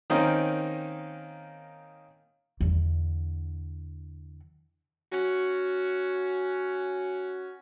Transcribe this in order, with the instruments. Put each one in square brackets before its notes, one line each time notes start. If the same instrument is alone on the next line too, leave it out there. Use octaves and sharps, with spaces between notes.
[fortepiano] D#3 A#3 C4 C#4 D#4
[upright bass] E2 D3
[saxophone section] C#4 F#4